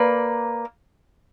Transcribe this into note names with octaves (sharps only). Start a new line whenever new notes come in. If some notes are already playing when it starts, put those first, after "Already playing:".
Already playing: A#3 B4 D5